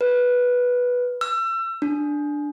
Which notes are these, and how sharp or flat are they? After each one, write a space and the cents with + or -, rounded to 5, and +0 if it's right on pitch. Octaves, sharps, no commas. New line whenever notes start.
B4 -5
E6 +35
D4 +5